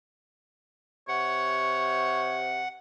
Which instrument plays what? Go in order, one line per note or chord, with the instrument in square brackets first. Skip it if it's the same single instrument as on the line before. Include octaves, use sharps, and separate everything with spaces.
[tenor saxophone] C3 [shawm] C#5 [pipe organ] F#5